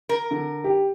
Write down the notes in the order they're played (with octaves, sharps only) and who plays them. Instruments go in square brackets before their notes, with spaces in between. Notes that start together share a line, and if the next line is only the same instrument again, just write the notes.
[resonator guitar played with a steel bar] A#4
[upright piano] D3
G4